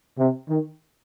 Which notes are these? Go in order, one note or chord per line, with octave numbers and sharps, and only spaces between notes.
C3
D#3